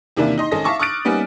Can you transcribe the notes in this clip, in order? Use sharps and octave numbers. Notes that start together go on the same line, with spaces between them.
E2 C3 D#3 A#3 D4 E4
D#4 D#5 C6
G#1 C#4 A4 D#5 A#6
E5 F5 A5 C#6 D6
C#6 D#6 F6 F#6 A6 D7
G3 A#3 B3 C#4 D#4